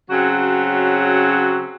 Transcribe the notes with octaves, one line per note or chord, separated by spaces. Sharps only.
C#3 F#3 C4 C#4 F#4